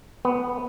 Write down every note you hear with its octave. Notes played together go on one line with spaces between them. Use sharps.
B3